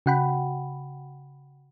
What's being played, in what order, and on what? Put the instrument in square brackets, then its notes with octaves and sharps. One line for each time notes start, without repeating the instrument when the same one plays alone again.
[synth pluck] C#3 F#4 F#5 G5 B5